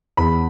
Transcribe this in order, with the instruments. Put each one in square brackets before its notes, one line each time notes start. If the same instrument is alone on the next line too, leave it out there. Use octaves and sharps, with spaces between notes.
[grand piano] E2 B5